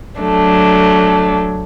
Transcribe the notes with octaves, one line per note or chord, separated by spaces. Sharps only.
F#3 A3 D4